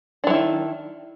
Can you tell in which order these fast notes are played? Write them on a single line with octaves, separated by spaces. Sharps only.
D4 F#3 E4 D#3